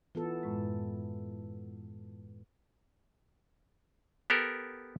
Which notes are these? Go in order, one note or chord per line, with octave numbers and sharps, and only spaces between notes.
E3 B3 F4 A4
F#2 A2 G#3
B3 G4 A4 A#4